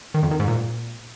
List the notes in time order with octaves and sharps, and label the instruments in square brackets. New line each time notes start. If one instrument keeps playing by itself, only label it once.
[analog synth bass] D#3
F2
D#3
G#2
A#2